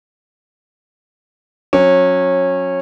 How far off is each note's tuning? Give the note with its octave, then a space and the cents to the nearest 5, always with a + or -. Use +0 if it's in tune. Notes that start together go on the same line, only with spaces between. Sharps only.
F#3 -30 C#4 -20